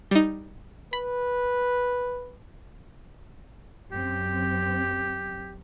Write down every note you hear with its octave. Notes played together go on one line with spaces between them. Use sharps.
G3 D#4
B4 B5
F#2 C4 G4